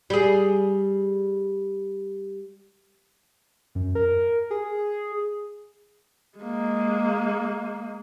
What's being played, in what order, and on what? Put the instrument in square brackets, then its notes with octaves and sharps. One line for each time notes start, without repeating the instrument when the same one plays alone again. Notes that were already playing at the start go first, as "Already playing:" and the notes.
[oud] G3 G#4
[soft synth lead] F#2
A#4
G#4
[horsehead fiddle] G#3 A#3